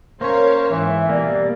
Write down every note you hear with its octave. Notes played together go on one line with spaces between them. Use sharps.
A#3 C#4 A#4 C5 C#5 F5
G#2 E3 E5
B2 G3 A#3 D5